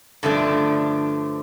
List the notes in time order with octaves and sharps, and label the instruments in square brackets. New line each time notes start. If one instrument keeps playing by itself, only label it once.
[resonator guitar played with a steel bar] G2 D3 F3 A3 D4